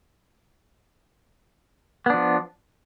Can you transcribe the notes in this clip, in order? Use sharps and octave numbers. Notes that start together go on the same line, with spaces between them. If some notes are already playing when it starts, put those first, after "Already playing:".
F3 B3 D4